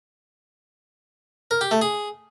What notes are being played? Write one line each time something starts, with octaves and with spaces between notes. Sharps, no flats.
A#4
G4
A3
G#4